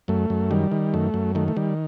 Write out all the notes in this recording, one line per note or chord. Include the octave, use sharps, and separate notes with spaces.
F#2 A3
F#2
D#3 G3
D#3
F#2 A3
F#2
D#3 A3
A3
D#3 G3